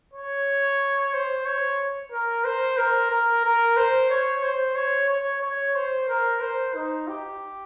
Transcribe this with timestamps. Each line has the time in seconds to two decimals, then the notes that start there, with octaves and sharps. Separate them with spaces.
0.13 C#5
1.13 C5
1.45 C#5
2.12 A#4
2.44 C5
2.78 A#4
3.11 A#4
3.44 A#4
3.77 C5
4.10 C#5
4.43 C5
4.75 C#5
5.10 C#5
5.42 C#5
5.75 C5
6.08 A#4
6.41 C5
6.74 D#4
7.08 G4